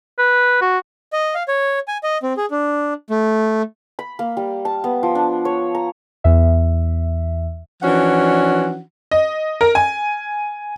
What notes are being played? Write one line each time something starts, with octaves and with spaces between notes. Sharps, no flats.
B4
F#4
D#5
F5
C#5
G#5
D#5
C4
G#4
D4
A3
B5
A#3
G3
A5
B3
F3
D4
C#5
A#5
E2 E5
E3 F3 C#4 D4 F#4 F#5
D#5
A#4
G#5